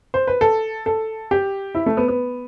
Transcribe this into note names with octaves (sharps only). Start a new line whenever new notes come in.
C5
B4
A4
A4
G4
E4
A3
B3
B3